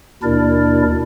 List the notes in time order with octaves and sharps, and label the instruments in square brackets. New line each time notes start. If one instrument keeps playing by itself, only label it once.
[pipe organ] D#2 B2 D4 E4 A#4 D5